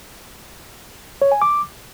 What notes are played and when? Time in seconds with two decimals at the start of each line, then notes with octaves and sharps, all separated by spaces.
1.22 C#5
1.32 G#5
1.42 D6